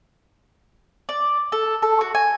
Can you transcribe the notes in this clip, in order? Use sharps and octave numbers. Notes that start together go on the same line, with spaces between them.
D5
A4
A4
F#4
G#5